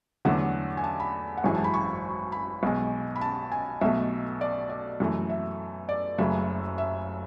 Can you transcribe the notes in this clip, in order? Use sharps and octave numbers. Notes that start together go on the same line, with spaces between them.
E2 D3 F#3 A3 F#5
G#5
A5
B5
F#5
G#1 F#2 E3 G#3 G#5
A5
B5
C#6
B5
B1 B2 G#3
B5
A5
G#5
B1 B2 A3 E5
D5
D5
F#2 E3 A3
E5
D5
F#1 F#2 C#3 F#3 A3 E5
E5